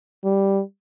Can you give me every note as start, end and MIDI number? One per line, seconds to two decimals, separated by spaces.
0.24 0.61 55